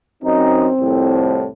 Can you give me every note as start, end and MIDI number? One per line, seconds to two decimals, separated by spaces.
0.23 0.69 42
0.23 1.48 60
0.23 0.69 63
0.80 1.46 36
0.80 1.46 41
0.80 1.46 45